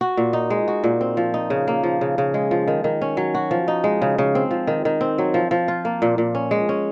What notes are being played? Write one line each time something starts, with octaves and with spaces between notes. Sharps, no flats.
F#4
A#2
D#4
G#3
F#4
A#2
C4
F3
D#4
C#3
A#3
F3
C#3
C#3
G#3
F3
D#3
D#3
C#4
F#3
F#4
F3
D#4
G#3
C#3
C#3
C4
F3
D#3
D#3
C4
F#3
F3
F3
F4
A#3
A#2
A#2
C#4
G#3
C#4